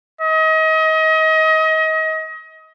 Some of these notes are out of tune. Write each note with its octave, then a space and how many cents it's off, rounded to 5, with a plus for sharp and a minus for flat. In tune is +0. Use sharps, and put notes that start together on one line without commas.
D#5 +30